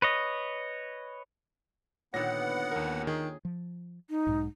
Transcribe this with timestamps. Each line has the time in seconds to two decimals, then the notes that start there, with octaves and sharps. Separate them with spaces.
0.02 B4 C#5 D#5
2.14 A#2 D3 D#3 B3 C#5 F#5 A#6
2.71 D#2 A#4
3.07 D#3 G#4
3.45 F3
4.10 D#4
4.27 B1 G#2